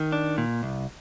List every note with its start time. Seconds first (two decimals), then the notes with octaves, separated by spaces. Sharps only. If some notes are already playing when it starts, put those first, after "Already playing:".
Already playing: D#3
0.12 D4
0.38 A#2
0.63 C2